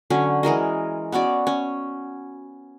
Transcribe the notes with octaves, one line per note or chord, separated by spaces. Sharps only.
D3 F#3 C#4
E3 G#3 A#4 D#5
B3 C#4 F#4 D5
C#4